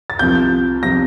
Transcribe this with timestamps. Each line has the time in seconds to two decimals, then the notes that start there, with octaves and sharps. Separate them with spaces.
0.10 A6
0.19 C2 C3 F3 G6
0.83 C3 F3 A#6